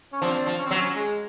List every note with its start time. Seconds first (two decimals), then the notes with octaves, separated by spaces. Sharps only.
0.13 C#4
0.21 F3 C4 D4
0.46 F3
0.59 C#4
0.66 C4
0.71 F#3
0.75 C#4
0.96 G#3